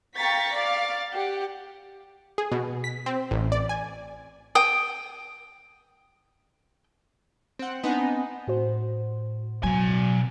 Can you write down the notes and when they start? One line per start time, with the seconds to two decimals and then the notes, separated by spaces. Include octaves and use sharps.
0.16 F5 G5 A#5 C#6 A6 B6
0.55 D5 F5 D6 A6
1.13 G4 F#5
2.38 G#4
2.52 B2
2.84 B6
3.06 C4
3.31 A1
3.52 D5
3.69 G#5
4.55 G5 D#6
7.59 C4 F#5
7.84 B3 C4 D4 D#4 F#5 G#5
8.47 A2 F#4 C5
9.63 B2 F#3 G#5